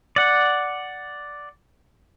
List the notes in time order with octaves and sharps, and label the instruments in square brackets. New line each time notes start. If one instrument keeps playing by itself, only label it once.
[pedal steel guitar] D5 F#5